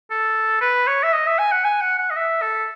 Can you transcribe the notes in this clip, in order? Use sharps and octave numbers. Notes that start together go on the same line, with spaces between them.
A4
B4
C#5
E5
D#5
E5
G#5
F#5
G#5
F#5
F#5
D#5
E5
A4